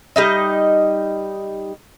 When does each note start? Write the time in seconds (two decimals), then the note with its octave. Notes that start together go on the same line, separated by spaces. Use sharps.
0.16 G3 D#4 D#5